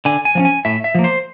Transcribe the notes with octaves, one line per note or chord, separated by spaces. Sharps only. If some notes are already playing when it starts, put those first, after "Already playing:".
D3 G#5
G#5
F3 A#3 C#4
G#5
A2 E5
E5
F3 A#3
C5